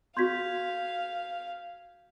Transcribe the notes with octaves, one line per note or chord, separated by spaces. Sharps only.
F#4 F5 C6 G6 G#6 B6